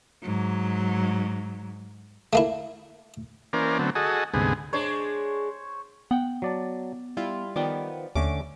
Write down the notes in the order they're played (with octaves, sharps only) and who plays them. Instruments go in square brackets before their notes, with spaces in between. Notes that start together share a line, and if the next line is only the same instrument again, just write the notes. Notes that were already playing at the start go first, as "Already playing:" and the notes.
[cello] G#2 F#3
[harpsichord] A3 A#3 E4
[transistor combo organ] E3 A#3 C#4 A#4 C5 D5
D3 F#3 A3 B3 C4
F#4 G#4 A4 D#5
D2 G#2 C3 B3 G#4
[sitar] G#3 D4 [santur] C5 C#5
[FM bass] B3 [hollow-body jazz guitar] F#5 G5
[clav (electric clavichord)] F#3 D5 A5
[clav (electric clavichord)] G3 [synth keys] E4 F4
[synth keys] D#3 F3 B3 [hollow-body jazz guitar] D5 G5
[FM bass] D#2 [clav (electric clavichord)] D3 A3 C#4 [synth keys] D6